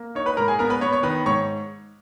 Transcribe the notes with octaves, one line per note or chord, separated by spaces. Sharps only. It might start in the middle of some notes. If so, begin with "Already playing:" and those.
Already playing: A#3
D#4 C#5
B4 B5
G#2 A#4 A#5
G#4 G#5
B3 A#4 A#5
B4 B5
B3 C#5 C#6
C#5 C#6
D#3 B4 B5
G#2 C#5 C#6